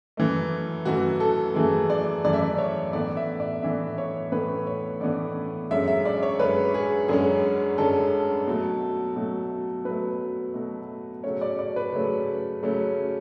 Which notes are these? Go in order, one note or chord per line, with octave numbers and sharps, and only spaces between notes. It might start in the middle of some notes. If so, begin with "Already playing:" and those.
F#2 E3 A3
F#2 E3 A3 F#4
A4
F#2 E3 A3 G#4
D5
F#2 E3 A3 D5
E5
D5
C#5
A2 E3 B3 D4 D5
E5
D5
A2 E3 B3 D4 E5
C#5
A2 E3 B3 D4 B4
C#5
A2 E3 B3 D4 D5
F#2 D3 G#3 C#4 E5
E5
D5
C#5
F#2 D3 G#3 C#4 B4
G#4
F#2 D3 G#3 C#4 G#4
F#2 D3 G#3 C#4 A4
B2 F#3 A3
B2 F#3 A3
B2 F#3 A3 B4
B2 F#3 A3
C#3 F#3 A3 C#4 C#5
D5
D5
B4
C#3 F#3 A3 C#4
C#3 F#3 A3 C#4